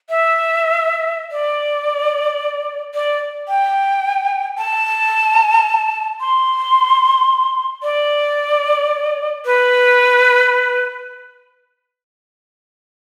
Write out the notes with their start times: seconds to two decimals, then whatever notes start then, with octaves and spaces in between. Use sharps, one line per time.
0.10 E5
1.32 D5
2.94 D5
3.48 G5
4.58 A5
6.20 C6
7.83 D5
9.46 B4